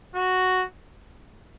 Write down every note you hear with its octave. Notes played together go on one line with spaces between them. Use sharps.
F#4